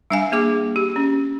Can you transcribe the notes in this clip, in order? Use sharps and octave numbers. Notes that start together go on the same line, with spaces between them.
G3 D4 E5 F5 G#5
A#3 G#4 D6
G4
C#4